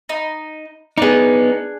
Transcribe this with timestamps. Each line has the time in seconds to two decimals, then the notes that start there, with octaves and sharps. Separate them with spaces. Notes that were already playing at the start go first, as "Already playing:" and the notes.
0.09 D#4
0.98 B3 D4 D#4 G#4